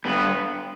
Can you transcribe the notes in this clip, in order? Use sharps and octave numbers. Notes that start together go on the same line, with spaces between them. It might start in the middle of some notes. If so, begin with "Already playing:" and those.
G2 B3